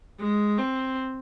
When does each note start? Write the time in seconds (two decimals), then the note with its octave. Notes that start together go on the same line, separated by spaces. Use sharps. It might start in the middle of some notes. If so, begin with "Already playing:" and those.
0.20 G#3
0.58 C4